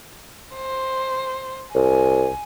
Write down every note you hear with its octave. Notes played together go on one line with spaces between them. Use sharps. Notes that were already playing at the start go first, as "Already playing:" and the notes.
C5
C2 G#5